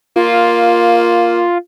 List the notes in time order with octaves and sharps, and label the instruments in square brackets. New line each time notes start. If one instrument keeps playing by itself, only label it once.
[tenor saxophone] A#3 [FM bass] F4